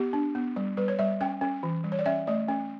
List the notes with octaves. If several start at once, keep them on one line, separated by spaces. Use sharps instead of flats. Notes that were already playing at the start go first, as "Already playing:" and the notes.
Already playing: B3 G4
D4
B3
G3
G3 B4
C#5
G3 E5
C#4 G5
C#4
E3
G3
C#5
D5
C#4 E5
A3 D5
C#4